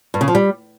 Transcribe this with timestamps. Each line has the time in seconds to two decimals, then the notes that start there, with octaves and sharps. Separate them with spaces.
0.14 G2
0.21 C#3
0.28 F3
0.35 G3